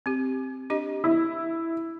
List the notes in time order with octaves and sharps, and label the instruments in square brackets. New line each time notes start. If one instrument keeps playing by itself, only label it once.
[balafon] C4 G4
D4 G4 D#5
[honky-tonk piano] E4